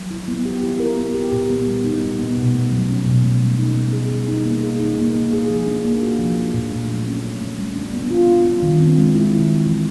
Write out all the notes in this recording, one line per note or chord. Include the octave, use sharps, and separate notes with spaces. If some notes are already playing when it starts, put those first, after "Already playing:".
Already playing: F#3
E4
B3
G4
E4
A#4
B3
G4
A#2
B3
G3
D#4
A#2
B3
B2
A3
F#3
C#4
B2
A3
G3
D#4
B3
G#4
G3
D#4
A#3
G#4
D#4
A#3
A#3
G#4
F3
D4
A#3
F#4
F3
D4
A#2
A3
F#3
C#4
A#2
A3
G3
D4
B3
F4
G3
D4
D#3
C4
G#3
E4
D#3
C4
E3